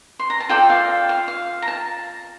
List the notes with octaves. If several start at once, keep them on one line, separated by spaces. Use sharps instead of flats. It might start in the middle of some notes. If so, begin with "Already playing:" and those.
C6
A#5
A5
F4 A4 D5 G5
F5
F5
F5
A#5
A5